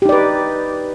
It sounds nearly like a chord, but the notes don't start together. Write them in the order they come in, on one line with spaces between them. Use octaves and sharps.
G4 D#4 D5 B4